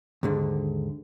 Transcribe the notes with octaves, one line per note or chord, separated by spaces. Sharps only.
D#2 G#2 D3